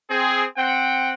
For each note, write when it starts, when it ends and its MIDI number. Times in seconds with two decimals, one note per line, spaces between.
0.10 0.44 60
0.10 0.44 68
0.57 1.14 60
0.57 1.14 78
0.57 1.14 79